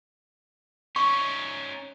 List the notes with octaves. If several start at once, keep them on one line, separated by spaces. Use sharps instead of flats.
C#4 D#4 C#6